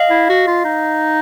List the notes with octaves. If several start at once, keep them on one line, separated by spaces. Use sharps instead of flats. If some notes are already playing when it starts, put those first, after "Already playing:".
Already playing: D#5 F5
E4
F#4
F4
D#4